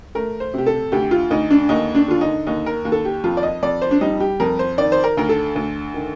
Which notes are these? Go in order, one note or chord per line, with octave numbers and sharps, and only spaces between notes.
A3 A#4
C5
C3 G4
A4
D2 G4
F4
D2 D#4
D4
D#2 D#4
D4
D3 F4
D#4
D#2 D#4
A#4
D#2
A4
G4
F2 F4
D5
D#5
F2 D5
C5
D4
G3 D#4
G4
F2 A#4
C5
D#3 D5
C5
A#4
D2 A#4
A4
D2
D#3